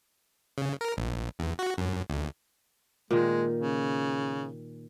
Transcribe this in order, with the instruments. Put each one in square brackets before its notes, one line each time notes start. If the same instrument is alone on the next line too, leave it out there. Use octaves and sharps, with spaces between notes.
[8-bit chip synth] C#3
A#4
A#1
E2
F#4
F#2
D2
[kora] A#2 D#3 [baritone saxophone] G#3
[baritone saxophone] C#3